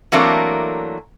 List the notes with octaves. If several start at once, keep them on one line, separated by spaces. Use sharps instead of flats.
E3 F#3 A3 A#3 C4 D4